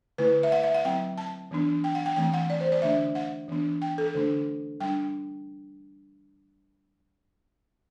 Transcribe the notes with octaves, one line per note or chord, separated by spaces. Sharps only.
D3 A3 E4 B4
E5
F#5
E5
F#5
F#3 C4 E4 G5
A5
E3 B3 D4
G5
F#5
G5
E3 A3 C4 G5
F#5
D5
C5
D5
D3 A3 D4 E5
F#5
E3 B3 D4
G5
A4
D3 A3 D4
G3 D4 G5